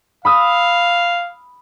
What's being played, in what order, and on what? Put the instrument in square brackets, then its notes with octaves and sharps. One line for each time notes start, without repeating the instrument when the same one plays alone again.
[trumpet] F5 [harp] B5 D#6 E6